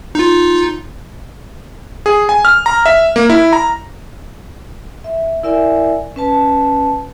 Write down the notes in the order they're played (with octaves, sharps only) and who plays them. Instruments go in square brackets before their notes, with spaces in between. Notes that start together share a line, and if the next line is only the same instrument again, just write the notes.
[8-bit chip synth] D#4 F4
[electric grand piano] G#4
G#5
F6
A#5
E5
A#3
E4
A#5
[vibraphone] E5
E4 A#4 D5 E5 G#5
C#4 B4 A5